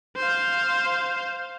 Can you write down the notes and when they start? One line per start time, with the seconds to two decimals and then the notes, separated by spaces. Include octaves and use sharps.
0.17 C5 F5